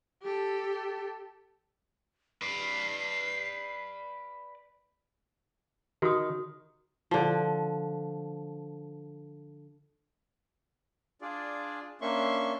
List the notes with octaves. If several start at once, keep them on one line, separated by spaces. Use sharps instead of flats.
G4 A4
B4 D5 C7
D#3 F#4 D#6
D3 F3
D4 F4 G#4 D5
A#3 C#4 D4 E5 C6 C#6